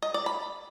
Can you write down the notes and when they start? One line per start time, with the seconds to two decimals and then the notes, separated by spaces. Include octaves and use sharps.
0.02 D#5
0.14 D5
0.26 B5